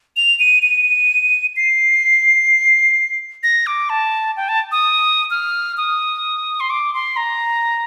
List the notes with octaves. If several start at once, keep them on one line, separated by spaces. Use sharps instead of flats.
F7
D#7
D#7
C7
A#6
D6
A5
G5
A5
D#6
F6
D#6
C6
D6
C6
A#5